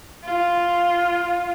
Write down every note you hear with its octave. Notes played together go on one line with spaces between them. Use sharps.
F4